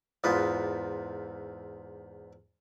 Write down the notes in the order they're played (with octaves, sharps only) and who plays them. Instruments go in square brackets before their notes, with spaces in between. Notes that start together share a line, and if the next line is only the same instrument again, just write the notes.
[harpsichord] E2 G#2 F4 B4 D#5